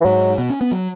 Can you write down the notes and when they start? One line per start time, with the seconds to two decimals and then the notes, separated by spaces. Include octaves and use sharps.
0.01 E3
0.05 G#2 F#3
0.38 B2
0.50 C#4
0.61 B3
0.72 F#3